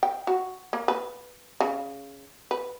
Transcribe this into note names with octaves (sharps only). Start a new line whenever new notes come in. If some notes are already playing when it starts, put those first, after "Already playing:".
G5
F#4
A#3
B4
C#3
B4